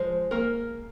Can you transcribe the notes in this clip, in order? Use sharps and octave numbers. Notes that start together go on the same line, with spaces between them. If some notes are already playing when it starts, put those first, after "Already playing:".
Already playing: F3 G#3 C5
A#3 A#4